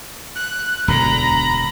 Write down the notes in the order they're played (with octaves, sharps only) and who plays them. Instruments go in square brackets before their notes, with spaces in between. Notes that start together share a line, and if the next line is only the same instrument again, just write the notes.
[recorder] F#6
[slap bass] E1 D2 D3 [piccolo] A#5 [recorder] B5